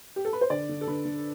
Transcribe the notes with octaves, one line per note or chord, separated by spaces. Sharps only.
G4
A4
B4
C5
D3 D5
D3
A4
D3 B4
D3